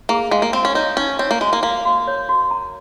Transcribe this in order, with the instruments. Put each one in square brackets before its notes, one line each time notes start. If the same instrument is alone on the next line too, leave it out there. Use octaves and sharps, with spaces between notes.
[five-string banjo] A#3 [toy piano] G#4
[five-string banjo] G#3 [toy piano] F5
[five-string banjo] A#3
[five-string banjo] C4 [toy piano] F#4
[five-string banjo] C#4
[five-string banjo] D#4 [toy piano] C#5
[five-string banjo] C#4 [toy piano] D#4
[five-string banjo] C4 [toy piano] C#5
[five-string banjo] A#3
[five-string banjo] G#3 [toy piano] F#4
[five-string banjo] A#3
[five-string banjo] A#3 [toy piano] F5
[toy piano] F#4
C#5
F#4
A#5